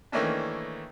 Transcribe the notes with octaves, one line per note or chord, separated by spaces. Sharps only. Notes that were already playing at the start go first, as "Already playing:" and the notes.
D#3 E3 A3 A#3 C#4 D4